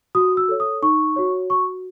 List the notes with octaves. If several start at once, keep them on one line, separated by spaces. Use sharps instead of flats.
F#4 D#6
E6
A4 C#5
D#6
D#4 C#6
F#4 C#5
F#4 C#6